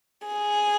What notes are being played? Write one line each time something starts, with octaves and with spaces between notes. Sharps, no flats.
G#4